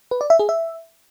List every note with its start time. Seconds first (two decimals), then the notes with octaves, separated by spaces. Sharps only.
0.11 B4
0.21 D5
0.30 E5
0.39 G#4
0.49 E5